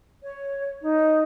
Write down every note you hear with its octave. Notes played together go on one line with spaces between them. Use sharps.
C#5
D#4